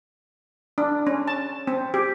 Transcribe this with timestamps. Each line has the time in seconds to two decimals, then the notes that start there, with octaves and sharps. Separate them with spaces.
0.78 D4
1.07 C#4
1.28 A5
1.67 C4
1.94 G4